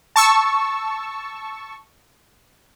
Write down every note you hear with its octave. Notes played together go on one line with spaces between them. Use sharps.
A5 C#6 E6